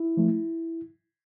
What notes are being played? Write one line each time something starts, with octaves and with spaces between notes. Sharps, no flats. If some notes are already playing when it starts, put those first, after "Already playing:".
Already playing: E4
F3 A3